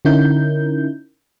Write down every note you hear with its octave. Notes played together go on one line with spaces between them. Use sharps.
D3 C#4 D#4 E4 A#4 G6